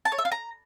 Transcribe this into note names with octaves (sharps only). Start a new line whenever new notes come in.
A5
C#5
E5
F5
A#5